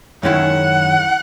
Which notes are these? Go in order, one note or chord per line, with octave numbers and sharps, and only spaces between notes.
F#2 D#3 G#3 C#4 E4 F#5